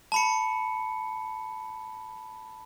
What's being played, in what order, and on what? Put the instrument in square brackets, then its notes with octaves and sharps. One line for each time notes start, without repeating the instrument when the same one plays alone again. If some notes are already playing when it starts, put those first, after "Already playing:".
[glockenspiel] A5 B5 C#7